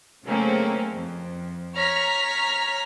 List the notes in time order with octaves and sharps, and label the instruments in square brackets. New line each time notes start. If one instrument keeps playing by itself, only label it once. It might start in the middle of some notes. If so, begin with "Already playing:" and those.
[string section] C#3 F#3 A3 A#3 C4 C#4
F2
C#5 A#5 F6 B6